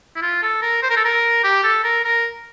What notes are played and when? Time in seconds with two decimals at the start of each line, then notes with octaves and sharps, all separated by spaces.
0.16 E4
0.22 F4
0.43 A4
0.62 A#4
0.83 C5
0.90 A#4
0.97 A4
1.05 A#4
1.44 G4
1.64 A4
1.84 A#4
2.05 A#4